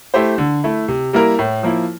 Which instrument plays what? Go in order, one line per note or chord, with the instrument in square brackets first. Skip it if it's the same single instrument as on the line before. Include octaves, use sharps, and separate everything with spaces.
[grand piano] A3 E4 G4 C5
D3
A3 E4
C3
G3 A#3 E4 A#4
A2
F3 A#3 E4